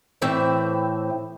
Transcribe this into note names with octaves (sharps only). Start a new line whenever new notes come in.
A2 E3 C4 E5